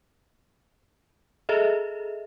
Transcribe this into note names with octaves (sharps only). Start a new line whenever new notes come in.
G#4 A4 D#5 E5